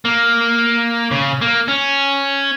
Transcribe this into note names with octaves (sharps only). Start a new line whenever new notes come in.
A#3
C#3
A#3
C#4